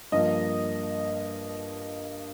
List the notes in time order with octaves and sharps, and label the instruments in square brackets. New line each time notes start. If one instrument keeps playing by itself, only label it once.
[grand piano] G2 F3 A#3 D#5